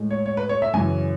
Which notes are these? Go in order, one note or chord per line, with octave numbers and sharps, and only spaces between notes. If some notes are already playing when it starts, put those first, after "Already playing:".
Already playing: A2 G#3
C#5
C#5
B4
C#5
E5
F#2 C#3 E3 G#5